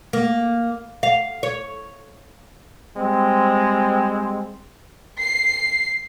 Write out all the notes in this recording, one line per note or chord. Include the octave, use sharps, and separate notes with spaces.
A#3
F5
C#5
G3 G#3 C4
C7